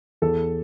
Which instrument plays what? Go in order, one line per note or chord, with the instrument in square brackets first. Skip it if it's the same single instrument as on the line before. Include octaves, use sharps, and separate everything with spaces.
[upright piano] E2 A4